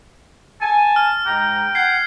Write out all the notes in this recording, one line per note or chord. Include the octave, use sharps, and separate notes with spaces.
G#5 A5
F6
G#2 G5 A#5
F#5 G#6 C7